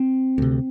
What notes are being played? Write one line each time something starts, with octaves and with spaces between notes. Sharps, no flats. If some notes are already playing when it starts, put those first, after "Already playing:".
Already playing: C4
D2 C3